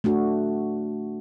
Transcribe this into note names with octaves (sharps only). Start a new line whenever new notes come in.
A3 D4 F#4